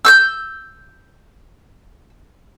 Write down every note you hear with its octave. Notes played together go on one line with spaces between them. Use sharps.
E6 F#6 G6